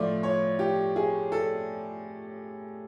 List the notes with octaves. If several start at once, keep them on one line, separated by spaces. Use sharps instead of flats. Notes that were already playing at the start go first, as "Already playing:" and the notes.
Already playing: A2 F3 A3 D5
C#5
G4
G#4
A4